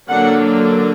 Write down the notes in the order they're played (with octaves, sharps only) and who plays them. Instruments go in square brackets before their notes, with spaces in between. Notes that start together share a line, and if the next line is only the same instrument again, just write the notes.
[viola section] D3 F#3 A#3 D4 F#5